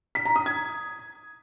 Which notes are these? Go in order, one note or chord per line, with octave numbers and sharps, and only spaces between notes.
B6
A#5
D#6
G#6